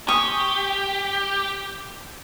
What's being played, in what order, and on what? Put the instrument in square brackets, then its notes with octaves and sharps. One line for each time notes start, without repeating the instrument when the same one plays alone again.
[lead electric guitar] G4 [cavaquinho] G#5 C#6 D#6